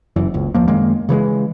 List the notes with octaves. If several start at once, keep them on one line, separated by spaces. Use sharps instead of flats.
F#1 F#2 E3
F#1 C#2
D#2 F3 A#3
F#2 D#3 G#3 A#3
C#3 E3 G3 G#3